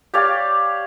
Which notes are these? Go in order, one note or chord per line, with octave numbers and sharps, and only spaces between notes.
G4 C#5 D5 F5